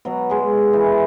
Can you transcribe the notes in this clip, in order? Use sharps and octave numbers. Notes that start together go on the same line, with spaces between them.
B2 F#3
G#3 G#4
E3